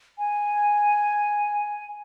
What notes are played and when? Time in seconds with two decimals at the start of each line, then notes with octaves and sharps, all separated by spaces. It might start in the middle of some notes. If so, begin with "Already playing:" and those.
0.19 G#5